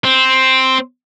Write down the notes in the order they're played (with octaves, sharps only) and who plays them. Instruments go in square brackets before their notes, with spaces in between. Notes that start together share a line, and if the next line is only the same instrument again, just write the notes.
[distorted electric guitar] C4